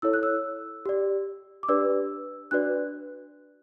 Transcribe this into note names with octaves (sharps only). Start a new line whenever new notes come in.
E4 A4 C#5 E6
F#6
E6
G4 D5
D6
D4 G4 B4 D5 E6
D4 F#4 B4 D5 F#6